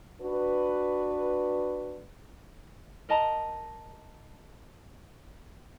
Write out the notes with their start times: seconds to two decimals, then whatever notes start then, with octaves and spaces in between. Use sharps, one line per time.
0.22 D4 F#4 B4
3.09 A#4 D#5 A5 A#5